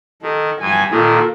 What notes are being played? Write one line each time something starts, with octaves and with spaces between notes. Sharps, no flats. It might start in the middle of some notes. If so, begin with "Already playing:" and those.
D#3 A4
G2 G#5
A#2 D#3 A#3 F4 A4